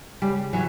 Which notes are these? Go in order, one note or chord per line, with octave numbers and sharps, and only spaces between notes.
C#3 G3
E3 F#3